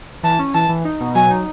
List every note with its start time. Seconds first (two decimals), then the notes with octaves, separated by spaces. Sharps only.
0.23 E3 A5
0.39 C#4
0.54 E3 A5
0.69 E3
0.85 D#4
1.01 B2
1.15 F#3 G#5
1.30 D#4